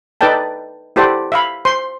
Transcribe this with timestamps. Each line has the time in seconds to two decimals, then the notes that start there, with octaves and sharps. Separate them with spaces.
0.21 D#4 A4 B4 D5 G5 A5
0.96 E4 G4 A4 C5 D5 F#5
1.32 E5 F5 B5
1.65 C5 C6